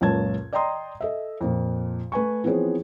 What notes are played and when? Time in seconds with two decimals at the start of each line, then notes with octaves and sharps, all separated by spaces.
0.01 C#2 F#2 A#2 C#5 A5 G#6
0.53 D5 D#5 G5 A#5 C6 D#6
1.01 A4 D#5 E5
1.41 F2 A#2
2.12 A3 B4 G#5 C#6
2.44 E3 F3 B3 C4 G#4 C#5